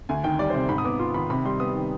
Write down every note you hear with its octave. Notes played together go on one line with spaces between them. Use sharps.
D2 G#5
D#3 G5
G3 D5
C5
C3 D5
G#2 B5
D#6
B3 D6
F4 C6
D#3 B5
C3 B5
G3 C6
B3 D#6
D#3